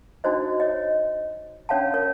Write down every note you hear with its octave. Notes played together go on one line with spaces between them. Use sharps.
D4 D#4 F#4 C5 D#5
C#5 D#5
C#4 D4 C#5 F5 F#5 A5
A#4 C#5